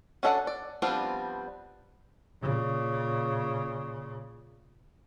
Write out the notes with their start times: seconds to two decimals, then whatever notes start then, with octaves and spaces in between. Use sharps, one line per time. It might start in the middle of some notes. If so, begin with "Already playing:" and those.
0.23 C#4 D4 A4 E5 F#5
0.47 D5
0.82 F3 G3 B3 C4 D4
2.42 A#2 C#3